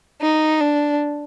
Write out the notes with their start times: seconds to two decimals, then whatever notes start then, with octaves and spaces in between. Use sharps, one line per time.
0.22 D#4
0.60 D4